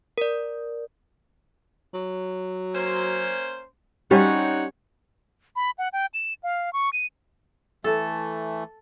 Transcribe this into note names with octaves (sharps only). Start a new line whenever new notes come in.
A#4 D5
F#3
A#3 C#4 C5
G3 C4 C#4 D#4 C#5 F#5
B5
F#5
G5
E7
F5
C#6
D#7
E3 A3 A4